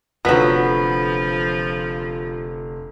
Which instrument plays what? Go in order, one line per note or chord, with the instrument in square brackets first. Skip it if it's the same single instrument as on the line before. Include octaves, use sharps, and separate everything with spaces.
[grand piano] F1 D3 [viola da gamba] F3 [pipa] F#3 B3 [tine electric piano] F4 B6